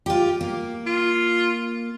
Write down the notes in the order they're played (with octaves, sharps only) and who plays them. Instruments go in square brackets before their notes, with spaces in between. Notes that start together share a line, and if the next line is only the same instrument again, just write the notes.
[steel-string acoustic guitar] F4 G4
A#3
[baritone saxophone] F4